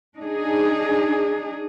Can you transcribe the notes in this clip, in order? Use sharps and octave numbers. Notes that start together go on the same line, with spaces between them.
D4 D#4 G#4